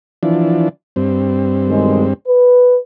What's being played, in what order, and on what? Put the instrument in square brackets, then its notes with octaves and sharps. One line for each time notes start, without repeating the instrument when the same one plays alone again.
[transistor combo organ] E3 F3 D4
G2 C4
[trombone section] B1 D#3 G#3
B4